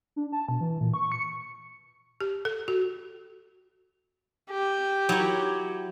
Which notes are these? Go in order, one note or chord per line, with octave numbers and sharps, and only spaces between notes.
D4
A5
B2
E3
A#2
C#6
C#7
G4
A4
F#4
G4
F#3 E4 C#5